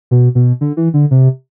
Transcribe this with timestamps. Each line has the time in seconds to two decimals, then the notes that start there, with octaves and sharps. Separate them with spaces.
0.11 B2
0.35 B2
0.61 D3
0.77 E3
0.94 D3
1.11 C3